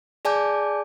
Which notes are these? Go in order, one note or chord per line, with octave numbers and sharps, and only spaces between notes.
G#4 D5 G#5 A5 D6 G6